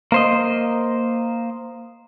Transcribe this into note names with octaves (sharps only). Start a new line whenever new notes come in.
A#3 C5 D#5